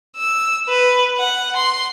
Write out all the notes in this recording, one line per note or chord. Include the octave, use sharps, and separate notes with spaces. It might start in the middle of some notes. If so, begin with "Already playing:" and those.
E6
B4
F#5
C6